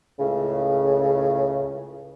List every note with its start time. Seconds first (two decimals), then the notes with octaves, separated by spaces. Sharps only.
0.19 C#2 A2 C#3